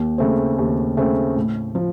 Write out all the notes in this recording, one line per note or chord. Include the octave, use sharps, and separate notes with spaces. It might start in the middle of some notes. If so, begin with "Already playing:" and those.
Already playing: D#2
C#3 A3 C4
D#2
C#3 A3 C4
A2
F3